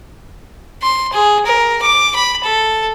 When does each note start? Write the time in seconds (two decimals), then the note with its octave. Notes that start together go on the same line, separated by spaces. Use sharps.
0.82 C6
1.12 G#4
1.45 A#4
1.82 D6
2.15 B5
2.43 A4